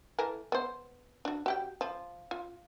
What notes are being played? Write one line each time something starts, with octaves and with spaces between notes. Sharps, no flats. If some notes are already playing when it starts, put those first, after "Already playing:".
E3 A4 A#4
B3 C5
D4 F#4
F#4 G4 G5
F3
F4